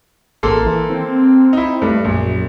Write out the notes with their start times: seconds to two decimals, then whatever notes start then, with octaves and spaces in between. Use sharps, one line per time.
0.43 A1 A#3 A4 C6
0.66 E3
0.90 C4
1.53 D#4 E4
1.82 G2 A3
2.04 A#1 F#2